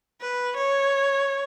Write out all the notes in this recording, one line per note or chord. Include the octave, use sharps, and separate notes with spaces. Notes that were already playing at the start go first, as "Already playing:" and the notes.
B4
C#5